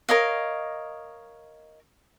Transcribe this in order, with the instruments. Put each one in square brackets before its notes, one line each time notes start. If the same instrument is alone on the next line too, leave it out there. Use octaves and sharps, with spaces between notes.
[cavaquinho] A#4 C#5 D#5 F5